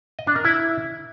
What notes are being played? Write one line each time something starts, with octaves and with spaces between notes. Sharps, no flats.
D#5
D4
A#4
E4